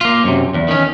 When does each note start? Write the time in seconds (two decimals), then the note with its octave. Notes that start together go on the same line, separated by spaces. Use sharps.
0.01 A#3 F4
0.24 F#2 C3
0.54 E2
0.68 D#3 C#4